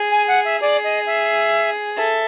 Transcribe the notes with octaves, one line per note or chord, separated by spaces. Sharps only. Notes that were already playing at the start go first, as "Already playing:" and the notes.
Already playing: G#4
G#5
F#5
E5
G#4 D5
D#5
E5
A4 E5